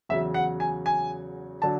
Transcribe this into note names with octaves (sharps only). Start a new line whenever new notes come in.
E2 C#3 F#3 E5
F#5
G#5
G#5
D3 F#3 A5